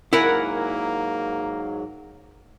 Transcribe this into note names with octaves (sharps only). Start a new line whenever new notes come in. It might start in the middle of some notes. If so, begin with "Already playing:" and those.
G#2 F#3 A#3 E4 A#4 F#5 G#5